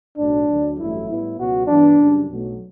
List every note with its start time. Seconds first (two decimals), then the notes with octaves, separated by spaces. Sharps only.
0.18 B1 A2 F#3 D4
0.48 D2 D3 F#3
0.78 A1 G2 F#3 A3 E4
1.08 A2 G3 B3 E4
1.38 C#2 B2 F#3 B3 F#4
1.68 G2 E3 B3 D4
1.99 F#2 C#3 G3
2.29 B1 B2 F#3 A3